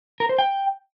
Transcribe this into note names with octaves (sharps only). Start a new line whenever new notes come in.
A#4
C5
G5